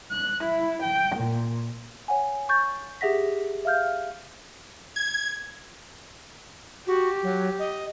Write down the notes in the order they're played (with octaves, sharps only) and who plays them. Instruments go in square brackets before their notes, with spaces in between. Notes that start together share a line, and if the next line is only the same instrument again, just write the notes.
[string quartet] F#6
E4
G5
A#2
[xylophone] C#5 F#5 G#5
C#6 G6 A6
G4 G#4 E5 F#5 A#6 B6
E5 F5 F6 G6
[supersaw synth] G#6
[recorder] F#4 [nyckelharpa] G4
[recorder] F#3
D#5